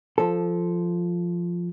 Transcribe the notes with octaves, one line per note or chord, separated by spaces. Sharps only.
F3 A4